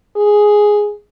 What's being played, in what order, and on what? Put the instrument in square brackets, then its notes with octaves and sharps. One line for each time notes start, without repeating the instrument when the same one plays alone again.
[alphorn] G#4